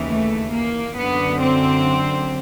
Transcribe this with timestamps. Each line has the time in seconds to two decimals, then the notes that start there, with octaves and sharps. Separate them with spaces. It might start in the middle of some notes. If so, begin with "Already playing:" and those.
Already playing: D#2 C#3 E3
0.08 A3
0.53 A#3
0.96 F#2 D3 B3
1.41 C4